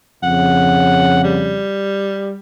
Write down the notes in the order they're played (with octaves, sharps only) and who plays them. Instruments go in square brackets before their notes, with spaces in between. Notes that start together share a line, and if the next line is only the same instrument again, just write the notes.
[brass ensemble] F2 C#3 [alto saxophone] F#5
[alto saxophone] G3